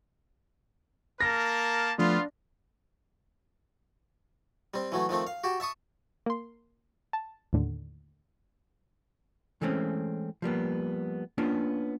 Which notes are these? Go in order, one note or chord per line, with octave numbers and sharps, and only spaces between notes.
A#3 A#4 A5 A#6
F3 A3 B3 D4 F4
G3 C4
E3 F#3 A3
D#3 F3 A3 C4
F5
F#4 G4 A5
E5 A5 C#6 D#6
A#3 C6
A5
D#2 A2 D3
E3 G#3 A3 C4 C#4
F3 G3 A#3 B3
A#3 B3 C#4 D4 F4